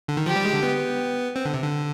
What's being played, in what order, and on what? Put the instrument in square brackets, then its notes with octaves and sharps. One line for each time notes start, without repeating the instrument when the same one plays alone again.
[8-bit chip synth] D3
D#3
[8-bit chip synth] F3 [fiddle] G4
[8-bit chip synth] G3
G#3
D3
B3
C4
D3
C3
D3